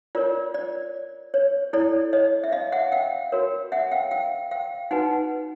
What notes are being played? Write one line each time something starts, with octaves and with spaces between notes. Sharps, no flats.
F4 A#4 C#5 D5
D5
C#5
E4 A4 C#5 D5
C#5 D#5
E5
D#5 F5
E5 F#5
F5 G5
F#4 A#4 C#5
E5 F#5
F5 G5
F5 G5
F5 G5
D#4 F#4 B4 F#5 G#5